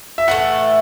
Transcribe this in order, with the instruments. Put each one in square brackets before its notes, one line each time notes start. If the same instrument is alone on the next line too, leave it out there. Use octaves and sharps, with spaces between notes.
[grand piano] E5
[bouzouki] A2 E3 A3 [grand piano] F#5